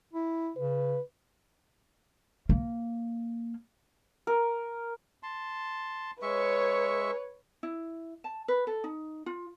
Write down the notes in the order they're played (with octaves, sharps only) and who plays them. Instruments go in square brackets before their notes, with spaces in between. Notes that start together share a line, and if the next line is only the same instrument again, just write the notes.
[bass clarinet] E4
[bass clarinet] C#3 [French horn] B4
[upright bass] A#3
[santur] A#4
[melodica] A5 C6
[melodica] G#3 E5 C#6 [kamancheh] B4 C#5
[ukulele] E4
A5
B4
A4
D#4
F4